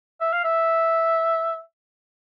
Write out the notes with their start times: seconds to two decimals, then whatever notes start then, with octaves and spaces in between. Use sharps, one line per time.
0.21 E5
0.33 F5
0.44 E5